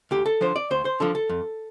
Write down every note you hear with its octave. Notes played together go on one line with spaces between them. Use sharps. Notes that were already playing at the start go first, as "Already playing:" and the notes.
D2 G4
A4
D3 F3 C5
D5
D2 C5
C5
D3 F3 A4
A4
F2